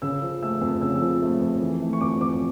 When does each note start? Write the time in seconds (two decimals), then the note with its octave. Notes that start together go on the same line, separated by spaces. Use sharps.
0.02 C#3 E6
0.22 F3
0.42 A3 E6
0.61 F2
0.82 C#3 E6
0.95 E6
1.02 F3
1.22 A3
1.41 F2
1.62 E3
1.82 A3
1.93 C#6
2.01 F2 D6
2.21 F2 D6